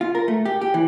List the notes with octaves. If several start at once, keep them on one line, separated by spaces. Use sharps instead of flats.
F4
A#4
A3
G4
G4
E3